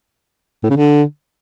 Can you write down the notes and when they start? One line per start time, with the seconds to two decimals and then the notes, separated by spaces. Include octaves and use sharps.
0.64 A2
0.70 C#3
0.76 D3